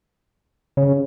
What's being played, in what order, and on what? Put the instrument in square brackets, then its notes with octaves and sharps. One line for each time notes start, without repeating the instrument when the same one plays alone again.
[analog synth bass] C#3